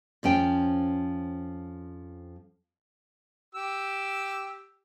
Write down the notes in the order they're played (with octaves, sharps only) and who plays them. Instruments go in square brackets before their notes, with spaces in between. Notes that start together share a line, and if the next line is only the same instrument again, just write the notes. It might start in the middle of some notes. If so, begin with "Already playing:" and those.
[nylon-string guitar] F2 F3 C#4 G5
[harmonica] G4 E6